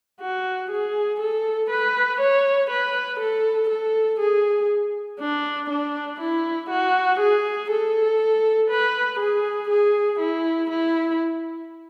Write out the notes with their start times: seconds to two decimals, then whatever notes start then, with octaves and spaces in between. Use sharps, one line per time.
0.21 F#4
0.71 G#4
1.20 A4
1.70 B4
2.20 C#5
2.70 B4
3.20 A4
3.70 A4
4.20 G#4
5.20 D4
5.70 D4
6.21 E4
6.70 F#4
7.20 G#4
7.71 A4
8.70 B4
9.20 G#4
9.70 G#4
10.20 E4
10.71 E4